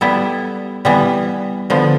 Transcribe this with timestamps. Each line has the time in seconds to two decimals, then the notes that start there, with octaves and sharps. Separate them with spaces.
0.01 G3 B3 E4 A4
0.85 E3 G3 B3
1.70 D3 F3 B3